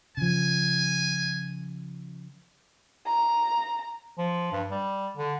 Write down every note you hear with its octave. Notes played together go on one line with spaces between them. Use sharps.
C#3 F3 G#5
A#5
F3
G2
G3
D3